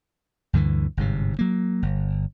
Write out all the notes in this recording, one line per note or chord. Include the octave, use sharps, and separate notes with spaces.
D2 G2 D3 E3
G1 G#2 C3
F#3 A#3
G1